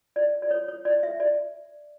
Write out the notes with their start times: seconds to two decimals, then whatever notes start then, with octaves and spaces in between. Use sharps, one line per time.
0.16 D5
0.42 D5
0.51 C#5
0.68 C#5
0.85 D5
1.03 E5
1.20 D5